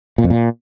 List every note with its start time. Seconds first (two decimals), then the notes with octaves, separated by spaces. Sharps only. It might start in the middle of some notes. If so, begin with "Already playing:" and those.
0.18 A#2
0.24 F2
0.30 A#2